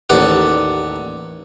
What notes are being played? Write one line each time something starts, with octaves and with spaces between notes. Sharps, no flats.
A1 D#2 D5 F#5